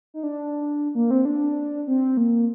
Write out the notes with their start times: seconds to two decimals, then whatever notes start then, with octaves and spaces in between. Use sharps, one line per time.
0.14 D#4
0.23 D4
0.95 A#3
1.11 C4
1.25 D4
1.87 C4
2.17 A#3